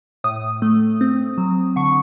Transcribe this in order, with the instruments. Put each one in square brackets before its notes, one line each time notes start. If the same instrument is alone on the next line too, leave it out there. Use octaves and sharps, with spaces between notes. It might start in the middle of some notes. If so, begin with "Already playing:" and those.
[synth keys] A2 D#6
A3
C4
F#3
D3 C#6